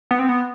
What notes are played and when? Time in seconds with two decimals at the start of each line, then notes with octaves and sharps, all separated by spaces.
0.11 B3
0.19 C4
0.29 B3